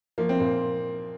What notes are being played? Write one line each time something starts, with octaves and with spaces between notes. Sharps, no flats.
F3 A#3
C4
A#2 A#3